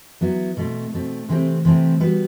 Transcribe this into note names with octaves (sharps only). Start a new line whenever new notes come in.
F#3 B3 E4
B2 A3 C4
B2 A3 C4
C3 E3 A3 C4 G4
C3 E3 A3 C4 G4
G3 B3 F#4 B4